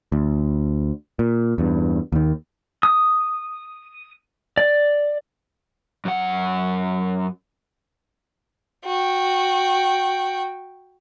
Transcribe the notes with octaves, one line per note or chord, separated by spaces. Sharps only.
D2
A#2
E2 G2
D#2 D#3
D#6
D5
F#2 F#5
F#4 G5